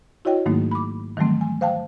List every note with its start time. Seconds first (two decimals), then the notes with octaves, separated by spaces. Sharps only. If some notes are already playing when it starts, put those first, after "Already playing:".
0.25 E4 F#4 C#5 D#5 G5
0.46 G#2 D#3 F#3 A3 A#3 D#4
0.71 B5 D6
1.17 D#3 E3 F#3 G3 A3 C4
1.41 G#5
1.61 C5 F5 G5 A5